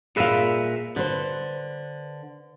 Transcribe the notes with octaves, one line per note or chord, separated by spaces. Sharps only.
A#2 G#4 B4 E5 F5
D3 B4 C5